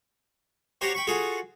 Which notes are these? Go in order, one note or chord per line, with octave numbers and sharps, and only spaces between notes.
F#4 G4 C5 C#5 A5 A#5
G5 B5 C#6
F4 F#4 G#4 A4 F#5